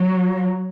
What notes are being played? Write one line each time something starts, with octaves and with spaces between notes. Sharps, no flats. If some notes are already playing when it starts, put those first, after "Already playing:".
Already playing: F#3